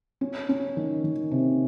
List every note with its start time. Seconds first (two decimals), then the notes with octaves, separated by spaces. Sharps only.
0.21 C#4
0.49 C#4
0.77 D#3
1.04 D#3
1.31 C3